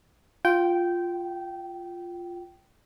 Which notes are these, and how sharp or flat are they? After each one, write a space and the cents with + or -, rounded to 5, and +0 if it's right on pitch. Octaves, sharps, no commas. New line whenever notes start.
F4 +0 G5 -15